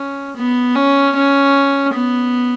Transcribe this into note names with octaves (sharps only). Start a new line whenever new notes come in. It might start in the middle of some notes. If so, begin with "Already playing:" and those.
Already playing: C#4
B3
C#4
C#4
B3